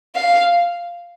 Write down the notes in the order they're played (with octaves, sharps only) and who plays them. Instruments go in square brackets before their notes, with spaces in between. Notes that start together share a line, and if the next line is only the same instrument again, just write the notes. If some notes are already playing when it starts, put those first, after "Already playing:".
[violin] F5